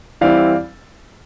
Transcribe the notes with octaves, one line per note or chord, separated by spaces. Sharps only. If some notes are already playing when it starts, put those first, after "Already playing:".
E3 G3 C4 E4 D5 F5